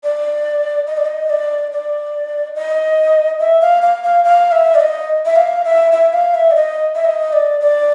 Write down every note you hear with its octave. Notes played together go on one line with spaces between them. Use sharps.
D5
D#5
D5
D#5
D5
D5
D#5
E5
F5
F5
F5
F5
E5
D5
D#5
E5
F5
E5
E5
F5
E5
D5
D#5
E5
D#5
D5
D5